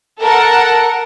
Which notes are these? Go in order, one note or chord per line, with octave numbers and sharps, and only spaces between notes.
A4 A#4 F#5